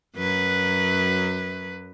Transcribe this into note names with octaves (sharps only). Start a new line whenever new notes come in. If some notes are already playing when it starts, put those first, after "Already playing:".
F#2 F#3 B4